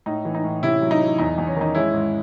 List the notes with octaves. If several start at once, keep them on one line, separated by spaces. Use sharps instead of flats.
A2 D#4
E3
D#4
A2
C3 C#4 E4
F#3
D#4
F#3
E2 D#4
E2
C#4
D#3 D#4
G#3 C#4 E4
G#2